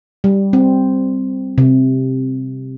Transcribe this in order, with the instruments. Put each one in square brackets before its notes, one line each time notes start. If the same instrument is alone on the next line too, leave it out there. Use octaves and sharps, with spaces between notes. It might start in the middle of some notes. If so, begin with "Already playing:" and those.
[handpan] G3
C4
C3